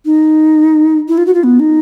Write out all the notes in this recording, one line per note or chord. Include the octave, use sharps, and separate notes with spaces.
D#4
E4
F4
F#4
F4
B3
D#4